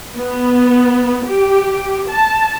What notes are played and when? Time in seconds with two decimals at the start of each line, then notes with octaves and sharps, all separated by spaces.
0.16 B3
1.26 G4
2.10 A5